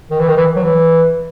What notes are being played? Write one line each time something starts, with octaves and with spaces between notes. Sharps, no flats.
D#3
E3
D#3
E3
F#3
E3